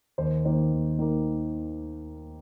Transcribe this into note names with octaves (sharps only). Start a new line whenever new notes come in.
D#2 C5
D#3 A#3 C5
D#2
D#3 A#3